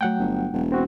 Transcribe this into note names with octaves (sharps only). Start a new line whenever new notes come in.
F#3 A3 F#5 G5
G1
E1
C4 F#4